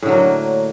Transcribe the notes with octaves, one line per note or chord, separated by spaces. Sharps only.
A2 D3 F#3 A#3